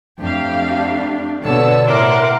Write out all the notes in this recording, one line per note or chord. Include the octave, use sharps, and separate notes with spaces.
F2 A3 D4 G4 F5
B2 D3 B3 C#5 A5 E6
A2 A#4 F#5 C6 D6